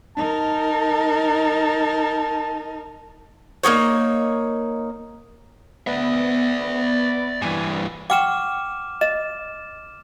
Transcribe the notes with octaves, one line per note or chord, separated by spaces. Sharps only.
D#4 A#4 A5
A#3 C4 D#4 C#5
B3 D5 E5
G2 E3 G#5
F#5 G5 C#6 D6 F6 E7
D#5 E7